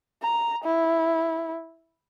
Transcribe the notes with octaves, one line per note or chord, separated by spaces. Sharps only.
A#5
E4